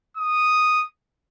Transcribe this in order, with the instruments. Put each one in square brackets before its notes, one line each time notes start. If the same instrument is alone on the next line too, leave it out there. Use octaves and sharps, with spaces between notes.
[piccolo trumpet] D#6